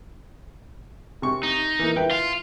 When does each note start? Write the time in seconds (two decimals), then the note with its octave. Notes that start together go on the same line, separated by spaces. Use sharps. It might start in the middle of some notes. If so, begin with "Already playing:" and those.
1.22 C3 C#6
1.43 D#4
1.79 E3 A#3
1.96 E4 B4 G5
2.11 F4